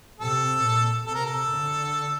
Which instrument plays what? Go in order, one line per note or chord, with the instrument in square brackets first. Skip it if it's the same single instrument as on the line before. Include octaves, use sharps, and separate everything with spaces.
[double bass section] C3 [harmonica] A4
[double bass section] A#2
[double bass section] C3 [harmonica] A4
[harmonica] A#4
A4
[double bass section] D3